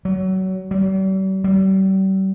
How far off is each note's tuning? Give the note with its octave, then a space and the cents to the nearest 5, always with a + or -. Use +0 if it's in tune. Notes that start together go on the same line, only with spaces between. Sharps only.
F#3 +25
G3 -45
G3 -40